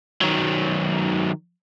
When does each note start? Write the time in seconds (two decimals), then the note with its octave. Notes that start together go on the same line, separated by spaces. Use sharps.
0.21 D#3 F#3